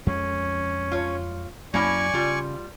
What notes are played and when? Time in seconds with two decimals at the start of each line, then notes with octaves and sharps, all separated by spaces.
0.07 F2 G#3 C#4
0.91 F4 C#5
1.74 F#2 F#3 A#3 C#4 E4 D5 G#5 C#6
2.14 C#3 G3 F4